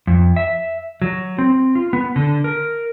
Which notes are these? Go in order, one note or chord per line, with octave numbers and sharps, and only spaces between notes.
F2
E5
F#3
C4
F4
B3
D3
A#4